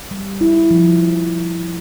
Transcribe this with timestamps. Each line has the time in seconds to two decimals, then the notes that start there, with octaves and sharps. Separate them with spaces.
0.11 G3
0.41 E4
0.71 F3